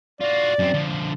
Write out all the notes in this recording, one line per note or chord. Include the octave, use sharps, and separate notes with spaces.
F4 F#4 D5
F#2 C4
D3 F3